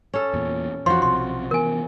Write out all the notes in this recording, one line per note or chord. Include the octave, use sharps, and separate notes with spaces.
C#4 A4
E2 A#2
F2 E3 F3 F#4 C6
B1 C3 C6
C3 E3 B3 A#4 G#5